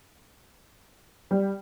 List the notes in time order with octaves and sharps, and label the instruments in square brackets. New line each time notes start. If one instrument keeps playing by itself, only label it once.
[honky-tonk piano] G3